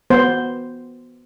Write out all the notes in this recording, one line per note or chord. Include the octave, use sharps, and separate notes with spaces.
B3 C5